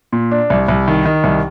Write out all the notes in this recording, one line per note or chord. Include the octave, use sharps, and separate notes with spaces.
A#2
D4
C2
C2
D#3
D#3
C2